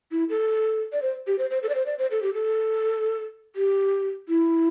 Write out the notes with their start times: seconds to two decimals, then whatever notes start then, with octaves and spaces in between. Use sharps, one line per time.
0.12 E4
0.29 A4
0.93 D5
1.02 C5
1.27 G4
1.39 C5
1.51 C5
1.63 A4
1.69 D5
1.75 C5
1.86 D5
1.98 C5
2.11 A4
2.23 G4
2.34 A4
3.56 G4
4.28 E4